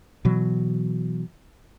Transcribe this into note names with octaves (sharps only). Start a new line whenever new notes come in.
B2 E3 F#3